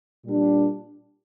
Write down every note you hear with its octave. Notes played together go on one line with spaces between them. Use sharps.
A#2 G3 D4